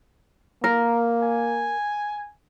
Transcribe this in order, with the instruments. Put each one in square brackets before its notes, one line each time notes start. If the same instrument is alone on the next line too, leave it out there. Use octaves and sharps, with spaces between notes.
[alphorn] A#3 [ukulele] A#4
[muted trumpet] G#5